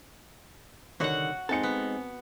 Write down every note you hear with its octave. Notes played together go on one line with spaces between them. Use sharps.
C2 D3 D#3 F#4 C#5 F#5
G#3 C4 D#4 A4 G#5 C#7
B3